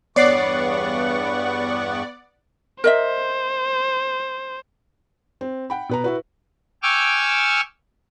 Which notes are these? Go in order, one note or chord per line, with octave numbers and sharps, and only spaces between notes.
E2 G2 B3 C#5 D5 F#5 C#6 C7
A#4 C5 D#5 E5
C4
F#5 G5 B5
B2 B4 A#5
E4 F#4 B4
G5 G#5 C#6 D6 E6 F6